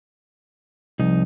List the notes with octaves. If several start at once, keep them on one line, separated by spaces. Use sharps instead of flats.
C2 F3 D#4